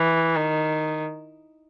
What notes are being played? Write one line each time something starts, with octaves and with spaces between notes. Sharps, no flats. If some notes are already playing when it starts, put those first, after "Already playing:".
Already playing: E3
D#3